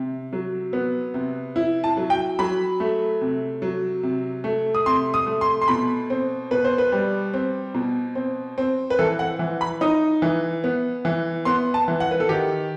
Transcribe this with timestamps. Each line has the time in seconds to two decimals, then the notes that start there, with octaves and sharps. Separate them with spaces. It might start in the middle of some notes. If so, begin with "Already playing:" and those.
Already playing: C3
0.33 F#3
0.73 B3
1.14 C3
1.56 E4
1.84 A5
1.97 F#3
2.10 G5
2.39 F#3 B5
2.80 A3
3.21 C3
3.62 F#3
4.03 C3
4.44 A3
4.75 D#6
4.86 C3 C6
5.14 D#6
5.26 A3
5.41 C6
5.62 C6
5.68 B2 B5
6.10 C4
6.51 B2 B4
6.64 C5
6.78 B4
6.92 G3
7.34 C4
7.74 B2
8.15 C4
8.58 C4
8.90 B4
8.99 E3 A4
9.19 F#5
9.39 E3
9.61 B5
9.81 D#4 D#6
10.22 E3
10.64 B3
11.05 E3
11.45 B3 C6
11.74 A5
11.88 E3
12.00 F#5
12.11 B4
12.20 A4
12.29 D#3 G4